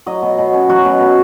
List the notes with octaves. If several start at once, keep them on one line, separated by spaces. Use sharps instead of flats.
F#3 D#5
B2
B2
C#4
F#3 F#4
B2
B2